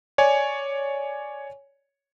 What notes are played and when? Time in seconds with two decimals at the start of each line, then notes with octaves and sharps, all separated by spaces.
0.18 C#5 D5 G#5